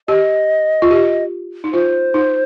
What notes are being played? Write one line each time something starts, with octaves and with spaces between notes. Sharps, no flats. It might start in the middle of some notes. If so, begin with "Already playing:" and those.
G4 D#5
F4
G4
D#4
F4 C5
D#4